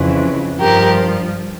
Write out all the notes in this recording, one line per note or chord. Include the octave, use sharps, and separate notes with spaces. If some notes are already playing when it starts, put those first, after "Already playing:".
Already playing: F2 C#3 E3
G2 F3 G4 A#4